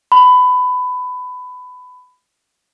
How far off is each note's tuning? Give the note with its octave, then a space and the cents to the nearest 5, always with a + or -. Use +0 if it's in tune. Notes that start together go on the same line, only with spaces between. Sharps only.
B5 +20